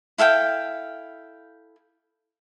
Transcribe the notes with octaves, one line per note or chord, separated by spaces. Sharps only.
E4 A4 F5 G5